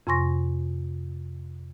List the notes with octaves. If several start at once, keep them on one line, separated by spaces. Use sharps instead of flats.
F2 C3 G#5 C6 C#6 A#6